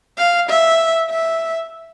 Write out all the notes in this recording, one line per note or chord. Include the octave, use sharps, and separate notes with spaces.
F5
E5
E5